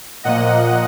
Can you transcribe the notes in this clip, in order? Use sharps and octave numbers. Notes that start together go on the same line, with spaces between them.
A#2 F3 A#3 D#5 F#5